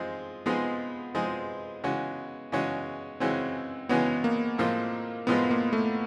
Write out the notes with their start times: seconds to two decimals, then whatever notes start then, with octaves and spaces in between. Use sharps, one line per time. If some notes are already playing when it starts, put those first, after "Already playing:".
Already playing: F3 G#3 C4 D#4 G#4
0.46 F3 G#3 B3 C4 D#4 G#4
1.15 F3 G#3 C4 D#4 G#4
1.84 C#3 E3 G#3 C#4 F#4
2.52 C#3 E3 G#3 C#4 F#4
3.20 C#3 E3 G#3 C4 C#4 F#4
3.89 C#3 E3 G#3 B3 C#4 F#4
4.24 A#3
4.58 A2 F3 G#3 A#3 C4 F4
5.27 A2 F3 G#3 B3 C4 F4
5.51 A#3
5.73 A3